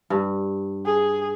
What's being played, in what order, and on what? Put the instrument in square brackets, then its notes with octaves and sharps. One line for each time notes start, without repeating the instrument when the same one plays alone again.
[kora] G2
[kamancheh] G#4